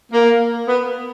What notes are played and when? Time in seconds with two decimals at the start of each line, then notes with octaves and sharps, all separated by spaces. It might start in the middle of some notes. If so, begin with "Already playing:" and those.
0.11 A#3
0.67 B3